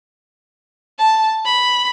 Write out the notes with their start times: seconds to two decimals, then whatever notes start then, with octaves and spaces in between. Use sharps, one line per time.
0.99 A5
1.45 B5